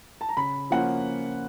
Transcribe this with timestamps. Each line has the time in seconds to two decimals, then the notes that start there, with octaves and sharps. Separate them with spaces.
0.21 A5
0.29 A#5
0.37 C#3 B5
0.70 F3 A#3 C#4 F4 F#5